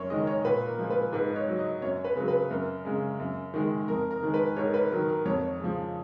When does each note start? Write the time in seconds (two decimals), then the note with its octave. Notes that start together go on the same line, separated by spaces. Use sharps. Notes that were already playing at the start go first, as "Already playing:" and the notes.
Already playing: F#2 A#4 C#5
0.10 D#3 G#3 D#5
0.27 C#5
0.44 A#2 B4
0.67 A#4
0.79 F3 G#3
0.90 B4
1.13 G#2 B4
1.32 D#5
1.36 C#5
1.48 F#3
1.59 D#5
1.82 F#2 C#5
2.04 B4
2.16 C#3 F#3
2.28 B4
2.50 F#2 A#4
2.85 C#3 G#3
3.19 F#2
3.54 D#3 G#3
3.88 F2 A#4
4.11 A#4
4.23 D#3 G#3
4.34 B4
4.56 G#2 C#5
4.66 A#4
4.74 B4
4.91 D#3 F#3 A#4
5.09 A#4
5.25 F2 C#5
5.60 C#3 F3